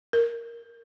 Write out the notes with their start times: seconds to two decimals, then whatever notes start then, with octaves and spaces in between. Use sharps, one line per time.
0.13 A#4